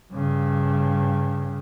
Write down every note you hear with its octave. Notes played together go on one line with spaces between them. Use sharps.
G2 C#3